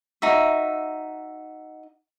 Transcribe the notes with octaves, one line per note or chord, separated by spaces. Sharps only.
D#4 F#4 E5